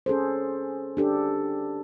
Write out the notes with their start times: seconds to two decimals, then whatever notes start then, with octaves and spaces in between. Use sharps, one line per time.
0.06 C#4 G#4 A4 C5
0.97 D4 G4 A4